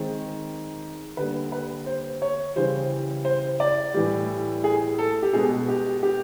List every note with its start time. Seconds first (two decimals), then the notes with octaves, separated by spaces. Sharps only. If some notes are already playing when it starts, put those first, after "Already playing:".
Already playing: D#3 G#3 C4
1.17 D3 G3 A#3 B4
1.52 B4
1.86 C5
2.22 C#5
2.56 C#3 E3 G3 C5
3.25 C5
3.60 D5
3.94 A2 E3 G3
4.64 G#4
4.99 A4
5.23 G4
5.33 B2 G#3 B3 G#4
5.68 G4
6.03 G4